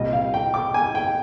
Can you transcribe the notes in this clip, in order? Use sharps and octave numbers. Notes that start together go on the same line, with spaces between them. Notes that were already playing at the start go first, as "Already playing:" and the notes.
Already playing: C2 A#2 G3 D#5
F5
G5
D6
G#5
G5